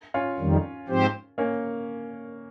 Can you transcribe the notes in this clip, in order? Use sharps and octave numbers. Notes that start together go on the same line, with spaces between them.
C#4 F4
F2 D#3 G3
G#2 F3 C4 G4 C5
A#3 C#4